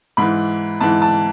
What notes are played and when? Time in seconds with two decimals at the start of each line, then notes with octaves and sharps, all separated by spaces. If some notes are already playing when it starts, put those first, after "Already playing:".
0.17 G#2 E3 B5
0.81 G#2 E3 A5
1.02 A5